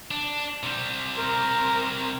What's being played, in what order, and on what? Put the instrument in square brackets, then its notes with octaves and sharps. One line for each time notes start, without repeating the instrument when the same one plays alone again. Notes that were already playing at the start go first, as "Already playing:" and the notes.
[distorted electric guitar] D4
C3 G3
[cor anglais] A#4